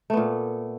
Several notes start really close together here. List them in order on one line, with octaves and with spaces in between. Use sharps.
A3 B3 A#2